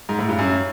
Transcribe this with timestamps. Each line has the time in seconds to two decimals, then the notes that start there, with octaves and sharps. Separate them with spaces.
0.09 G#2
0.19 A2
0.29 G2
0.39 F#2